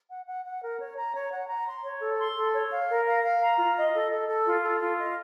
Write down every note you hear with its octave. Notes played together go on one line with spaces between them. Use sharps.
F#5
F#5
F#5
A#4
C#5
A#5
C#5
F#5
A#5
C6
C#5
A4
C6
A4
C#5
F5
A#4
F5
F5
A#5
F4
D#5
A4
A4
A4
F4
A4
F4
D#5